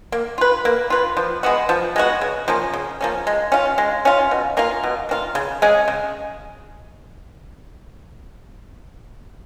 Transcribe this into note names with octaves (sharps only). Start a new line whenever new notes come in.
A#3
F4 B4
A#3
F4 B4
F3
G#3 B3 F#4
F3
G#3 B3 F#4
C#3
F3 A#3 C#4
C#3
F3 A#3 C#4
G#3
C#4 F4
G#3
C#4 F4
B2
A#3 C#4 F4
B2
A#3 C#4 F4
C#3
G#3 C#4 G#4
C#3